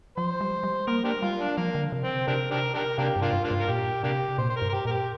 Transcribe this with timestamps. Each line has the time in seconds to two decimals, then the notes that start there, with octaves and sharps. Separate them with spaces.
0.17 F3 C5
0.41 G3
0.63 G3
0.87 A#3 A#4
1.05 D4 G4 A#4
1.23 G3 F4
1.40 D4
1.57 F3 A#3
1.75 D3
1.92 C3
2.04 C4
2.28 C3 D4 G4 A#4
2.51 D4 G4 A#4
2.74 D4 G4 A#4
2.98 C3 A#3 D4 G4
3.16 G2
3.22 A#3 D4 F4
3.33 G2
3.44 A#3 D4 F4
3.51 G2
3.61 A#4
3.68 A#2 G4
4.03 C3 A#3 D4 G4
4.38 A#2 C5
4.50 C5
4.57 A#4
4.62 G2
4.69 A#4
4.73 G4
4.85 A#2 A#4
4.91 G4